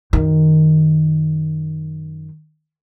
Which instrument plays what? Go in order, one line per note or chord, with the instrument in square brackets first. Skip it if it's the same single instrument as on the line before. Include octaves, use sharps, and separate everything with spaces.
[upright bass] F#2 D#3